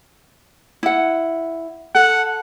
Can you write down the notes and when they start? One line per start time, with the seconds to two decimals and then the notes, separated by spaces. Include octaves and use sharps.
0.83 E4 F#5
1.95 A4 F#5